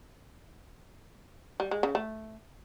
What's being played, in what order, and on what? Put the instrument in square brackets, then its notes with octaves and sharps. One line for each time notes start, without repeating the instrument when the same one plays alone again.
[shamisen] G3
G#3
C#3
A3